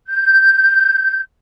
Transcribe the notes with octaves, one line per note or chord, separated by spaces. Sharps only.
G6